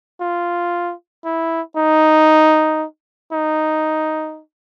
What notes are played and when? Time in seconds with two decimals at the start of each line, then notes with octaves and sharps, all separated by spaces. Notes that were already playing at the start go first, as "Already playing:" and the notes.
0.21 F4
1.25 E4
1.76 D#4
3.32 D#4